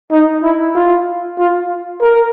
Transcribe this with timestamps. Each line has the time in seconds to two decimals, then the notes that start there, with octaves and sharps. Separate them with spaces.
0.11 D#4
0.43 E4
0.75 F4
1.39 F4
2.01 A#4